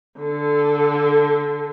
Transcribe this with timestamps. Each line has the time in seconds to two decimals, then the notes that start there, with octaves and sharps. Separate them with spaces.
0.20 D3 A4